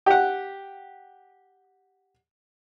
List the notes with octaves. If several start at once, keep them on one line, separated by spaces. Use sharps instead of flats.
G4 F#5